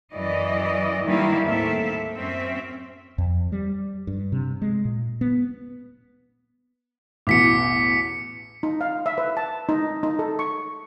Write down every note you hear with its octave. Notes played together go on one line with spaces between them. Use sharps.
F#2 E3 D5 D#5
G2 D#3 E3 G3 A#3 E4
D#2 A2 A#3 C4 A4 E5
F#2 C4 C#4 E5
F2
G3
G2
C3
G#3
A#2
B3
A1 E2 B2 D6 B6 C#7
D#4
F5
E5
B4
A5
D#4
D#4
A4
C#6